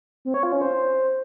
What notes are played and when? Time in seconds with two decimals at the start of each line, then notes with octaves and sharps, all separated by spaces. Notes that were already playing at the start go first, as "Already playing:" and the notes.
0.25 C4
0.34 C#5
0.43 F4
0.52 C#4
0.62 C5